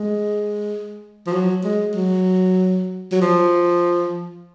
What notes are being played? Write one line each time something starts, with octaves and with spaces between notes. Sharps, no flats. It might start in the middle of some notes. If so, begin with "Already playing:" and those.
Already playing: G#3
F3
F#3
G#3
F#3
F#3
F3